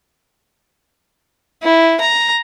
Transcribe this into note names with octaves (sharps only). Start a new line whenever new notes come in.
E4
A#5